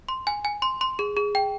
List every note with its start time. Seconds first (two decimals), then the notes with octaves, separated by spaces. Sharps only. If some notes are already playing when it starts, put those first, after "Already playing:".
0.09 C6
0.27 G#5
0.45 G#5
0.62 C6
0.81 C6
0.99 G#4
1.16 G#4
1.35 G5